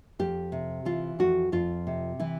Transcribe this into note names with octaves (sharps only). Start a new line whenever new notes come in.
F2 G4
C3
E3 F4
F2 F#4
F2 F4
C3
E3 E4